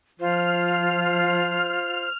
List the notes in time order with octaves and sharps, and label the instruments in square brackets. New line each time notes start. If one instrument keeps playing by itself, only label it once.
[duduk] F3 [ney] F4 [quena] C5 [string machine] F6